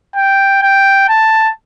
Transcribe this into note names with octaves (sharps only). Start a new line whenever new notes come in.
G5
G5
A5